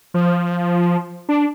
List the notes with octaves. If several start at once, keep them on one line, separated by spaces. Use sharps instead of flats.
F3
D4